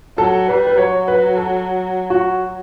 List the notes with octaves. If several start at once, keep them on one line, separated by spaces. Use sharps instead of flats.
F#3 A4
G3 B4
B4
F#3 C#5
B4
A4
F#4